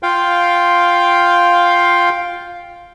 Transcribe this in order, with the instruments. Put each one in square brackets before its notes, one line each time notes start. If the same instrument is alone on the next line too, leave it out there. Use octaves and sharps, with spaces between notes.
[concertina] F4 F5 G5